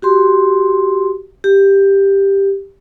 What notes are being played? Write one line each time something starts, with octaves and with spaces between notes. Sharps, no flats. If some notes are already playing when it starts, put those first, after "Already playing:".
F#4 G4 C6
G4